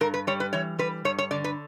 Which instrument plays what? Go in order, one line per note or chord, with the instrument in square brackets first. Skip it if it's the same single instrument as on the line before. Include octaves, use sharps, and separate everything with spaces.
[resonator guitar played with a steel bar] G2 A#4
B4
G3 C#5
B4
E3 C#5
G3 B4
G2 C#5
C#5
D3 D5
B4